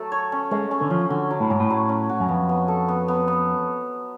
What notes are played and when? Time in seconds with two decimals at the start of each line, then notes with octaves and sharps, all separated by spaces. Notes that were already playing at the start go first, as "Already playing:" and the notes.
Already playing: F#3 A3 A4
0.12 C#5
0.32 C#4
0.51 G#3 C#4
0.71 C#4
0.81 D3
0.90 F3 C#4
1.10 D3 F#4
1.31 F#3
1.40 A2
1.50 G#2 F#3
1.60 A2
1.70 F#3
1.89 C#4
2.09 F#4
2.20 F#2
2.28 F2 B3
2.49 B3
2.68 A4
2.88 B3
3.08 B3
3.28 B3